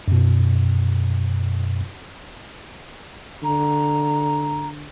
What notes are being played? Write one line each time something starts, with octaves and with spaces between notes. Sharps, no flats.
F#2 B2
D3 A#5